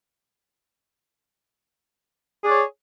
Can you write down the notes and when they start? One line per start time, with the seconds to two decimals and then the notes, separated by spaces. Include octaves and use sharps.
2.43 G#4
2.46 D5
2.49 C#5